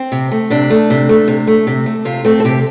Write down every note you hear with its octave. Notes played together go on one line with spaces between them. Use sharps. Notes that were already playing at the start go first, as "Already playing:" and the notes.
Already playing: C4
C3
A3
C3 D4
A3
C3
A3
C3
A3
C3
A3
C3 F4
A3 C4
A4
C3 G4